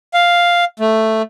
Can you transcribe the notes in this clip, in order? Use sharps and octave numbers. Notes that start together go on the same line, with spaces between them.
F5
A3